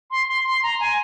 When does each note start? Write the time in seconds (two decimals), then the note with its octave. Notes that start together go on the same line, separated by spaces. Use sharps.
0.11 C6
0.28 C6
0.45 C6
0.63 A#5
0.80 G#5